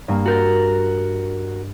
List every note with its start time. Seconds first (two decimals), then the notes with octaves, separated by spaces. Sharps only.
0.08 G2 A#3
0.26 F#4 A#4 A#5 G6 A6